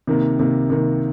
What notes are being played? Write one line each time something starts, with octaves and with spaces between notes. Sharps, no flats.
C3 D#3 A#3
C3 D#3 A#3
C3 D#3 A#3